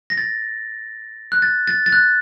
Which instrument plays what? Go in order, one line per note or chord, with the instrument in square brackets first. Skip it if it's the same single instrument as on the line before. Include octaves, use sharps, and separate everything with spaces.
[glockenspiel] A#6
A6
F#6
A6
A6
A6
F#6